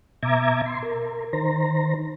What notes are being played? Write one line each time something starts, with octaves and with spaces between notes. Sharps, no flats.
B2 E5 A#5 D6 G#6
C6
A#4
D#3 C5 A#5